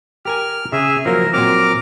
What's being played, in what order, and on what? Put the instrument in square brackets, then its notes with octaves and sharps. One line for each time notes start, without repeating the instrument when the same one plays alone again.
[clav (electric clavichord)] G4 A#4 G#5 [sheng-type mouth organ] F6
[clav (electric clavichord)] C#3 [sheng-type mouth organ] G#4 E5
[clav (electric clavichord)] F3 F#3 A#3 [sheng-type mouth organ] A#4
[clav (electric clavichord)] A#2 F#3 C4 [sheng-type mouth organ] A#4 D6 F6